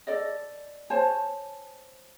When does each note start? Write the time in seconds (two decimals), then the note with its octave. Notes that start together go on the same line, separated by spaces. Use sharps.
0.07 A4 D5 D#5
0.90 C5 C#5 G#5 A5